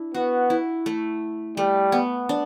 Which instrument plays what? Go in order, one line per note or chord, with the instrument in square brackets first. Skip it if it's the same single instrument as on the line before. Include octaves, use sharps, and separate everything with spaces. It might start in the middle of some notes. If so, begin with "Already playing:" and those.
Already playing: [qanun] D4 E4
[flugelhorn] B3 [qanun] F#4
[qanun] E4
A3
[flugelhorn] G3 [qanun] A3
[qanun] B3
D4